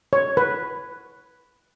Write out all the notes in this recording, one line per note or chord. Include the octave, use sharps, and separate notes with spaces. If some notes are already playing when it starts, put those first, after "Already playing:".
C#5
B4